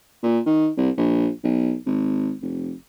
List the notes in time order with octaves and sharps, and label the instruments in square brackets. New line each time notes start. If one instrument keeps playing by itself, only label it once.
[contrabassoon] A#2
D#3
C2
A#1
B1
G#1
F1